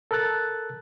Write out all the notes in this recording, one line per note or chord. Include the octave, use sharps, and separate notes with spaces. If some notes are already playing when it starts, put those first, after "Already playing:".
A4 A#4 E6 F#6 A6